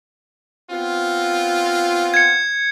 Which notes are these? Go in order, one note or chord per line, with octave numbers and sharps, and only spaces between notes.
B3 C4 F4
G#6 C#7